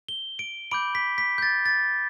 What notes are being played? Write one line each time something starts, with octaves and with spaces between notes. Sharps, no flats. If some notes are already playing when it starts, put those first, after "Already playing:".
G7
D7
B5 D6 G6 D7
B6
B6
G6
A6
A6